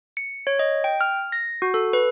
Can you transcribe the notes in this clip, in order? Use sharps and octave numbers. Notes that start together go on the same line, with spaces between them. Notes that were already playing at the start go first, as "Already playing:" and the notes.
C#7
C#5
D#5
G5
F6
A#6
F#4
A4
B4